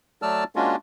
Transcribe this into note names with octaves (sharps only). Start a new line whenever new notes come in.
F#3 A3 D5 A5 E6 F6
G#3 A#3 C#4 D4 F4 F#4